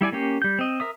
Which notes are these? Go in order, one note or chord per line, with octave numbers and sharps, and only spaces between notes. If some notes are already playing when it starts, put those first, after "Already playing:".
G3 E4 D5 G#5
A#3 C#4 G4
G3 G6
C4 D#5
A#4 E5 D#6